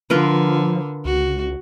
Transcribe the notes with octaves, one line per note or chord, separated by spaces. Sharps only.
D3 F3 F4 A#4 B4
C#2 F#4